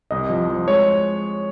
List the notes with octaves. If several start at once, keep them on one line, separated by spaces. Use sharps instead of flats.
C2 D#5
F3
F3
G#3 C#5